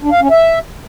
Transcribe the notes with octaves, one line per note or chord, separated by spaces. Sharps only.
D4
F5
C#4
E5